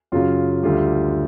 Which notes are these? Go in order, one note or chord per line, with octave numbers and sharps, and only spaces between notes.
F#2 C#3 F#3 F4
D2 D3 G3 F4